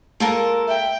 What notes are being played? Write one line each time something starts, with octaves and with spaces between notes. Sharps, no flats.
G#3 A#3 F4 A4 A#4
E5 G5